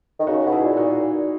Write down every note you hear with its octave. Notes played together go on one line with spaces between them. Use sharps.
D#3
C#3 D#4 F#4
B2
E4 G#4
A#2
D#4 F#4
A#2